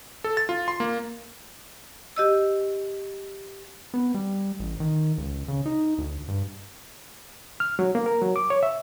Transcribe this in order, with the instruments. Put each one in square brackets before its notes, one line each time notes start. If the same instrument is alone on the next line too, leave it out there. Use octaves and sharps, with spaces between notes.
[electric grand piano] A4
A6
F4
C6
A#3
[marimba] G4 D#5 E6
[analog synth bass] B3
G3
A1
D#3
C#2
C#3
D#4
D2
G2
[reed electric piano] F6
F#3
A#3
A#4
F#3
D6
C#5
E5